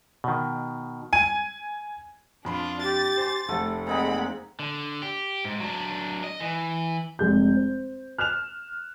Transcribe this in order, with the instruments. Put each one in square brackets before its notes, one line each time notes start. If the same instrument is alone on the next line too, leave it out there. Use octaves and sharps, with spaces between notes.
[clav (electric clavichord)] B2 D#3
[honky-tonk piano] G#5 D#7
[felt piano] F2 B5 C6 [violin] D4 F4
[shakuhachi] G4 [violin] A6
[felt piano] C5 G#5 C6
[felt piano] F1 [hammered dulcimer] A3 [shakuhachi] F#5
[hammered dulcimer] A#2 G#3 D#4 [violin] C4 B5
[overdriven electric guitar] D3
G4
G#2
F#3 D4
D#5
E3
[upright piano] F1 G#3 G6
C5
F6 F#6 E7 F7